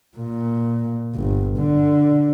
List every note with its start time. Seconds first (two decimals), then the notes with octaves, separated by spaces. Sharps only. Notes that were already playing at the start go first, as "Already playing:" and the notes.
0.17 A#2
1.15 G1
1.58 D3